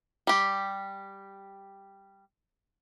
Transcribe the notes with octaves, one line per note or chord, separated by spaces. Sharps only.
G3 G4